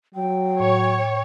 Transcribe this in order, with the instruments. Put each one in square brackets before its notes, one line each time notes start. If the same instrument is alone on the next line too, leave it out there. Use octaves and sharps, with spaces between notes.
[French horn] F#3 [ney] G5
[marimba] A2 [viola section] C#5